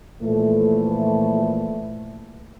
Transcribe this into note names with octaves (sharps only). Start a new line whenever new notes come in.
A#2 E3 F3 A3